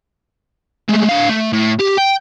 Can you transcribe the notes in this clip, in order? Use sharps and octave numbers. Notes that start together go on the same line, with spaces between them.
G#3 A3
D3 F5
A3
A2
G4
G5